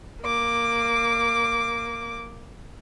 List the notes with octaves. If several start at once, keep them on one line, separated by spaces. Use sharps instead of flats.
A#3 D6